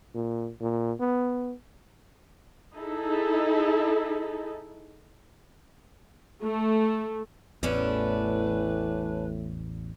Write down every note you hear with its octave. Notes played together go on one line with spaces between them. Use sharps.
A#2
A#2
B3
D#4 E4 G#4 A4
A3
A1 E2 A2 C#4 D4 E4 B4